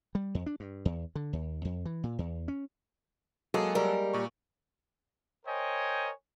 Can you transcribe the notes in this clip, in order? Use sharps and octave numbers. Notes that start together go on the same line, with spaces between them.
G3
F2
D4
G2
E2
D3
D#2
F2
E3
A#2
E2
C#4
F#3 G#3 A#3 G#4 A4
G3 A#4
A#2 C#6
A#4 C5 C#5 D#5 G5 G#5